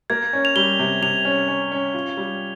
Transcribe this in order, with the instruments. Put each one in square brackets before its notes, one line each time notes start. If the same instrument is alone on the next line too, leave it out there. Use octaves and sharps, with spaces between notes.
[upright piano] A#3 [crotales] G#6
[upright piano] C#4
[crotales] F7
[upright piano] G3 [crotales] G7
[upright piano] C3
[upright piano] C3 [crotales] F7
[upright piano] C#4
C#4
C#4
F4
G3